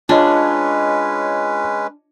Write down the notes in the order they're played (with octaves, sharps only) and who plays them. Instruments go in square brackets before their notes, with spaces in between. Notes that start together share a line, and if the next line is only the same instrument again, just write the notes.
[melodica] G#3 C#4 B4 [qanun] D4 [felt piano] F4 C#5 D#5